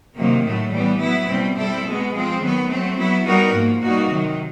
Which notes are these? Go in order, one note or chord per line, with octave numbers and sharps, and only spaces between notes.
C3 D#3 F#3 A#3
A2 F#3 A3
E3 G3 B3
F#3 B3 E4
B2 G3 C4
G3 C4 E4 A4
B2 G#3 B3
F3 G#3 C4
D#3 F#3 B3
F#3 A3 C4
F#3 B3 E4
G3 B3 D#4 F#4 A#4
G#2 F3 A#3
B2 G3 A#3 D#4 F#4
C3 D#3 F#3